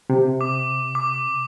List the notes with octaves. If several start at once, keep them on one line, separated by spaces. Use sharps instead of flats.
C3
D6
D6